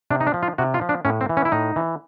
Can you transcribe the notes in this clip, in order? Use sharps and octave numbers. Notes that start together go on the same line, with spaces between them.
C3 D4
D#4
D4
F3
F4
C3 F#4
F4
F3
D4
A2 C#4
C4
E3
C#4
E4
A2 D#4
E3